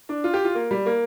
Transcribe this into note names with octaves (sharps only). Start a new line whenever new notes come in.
D4
F4
G4
F4
A#3
G3
A#3